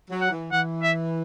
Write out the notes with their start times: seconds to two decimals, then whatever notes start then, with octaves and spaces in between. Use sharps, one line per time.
0.11 F#3
0.21 F#5
0.31 E3
0.52 E3 F#5
0.83 E5